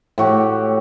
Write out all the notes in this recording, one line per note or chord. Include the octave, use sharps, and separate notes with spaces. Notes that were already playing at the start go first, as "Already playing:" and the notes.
A2 F#4 G4